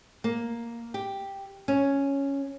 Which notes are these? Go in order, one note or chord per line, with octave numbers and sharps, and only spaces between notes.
A#3
G4
C#4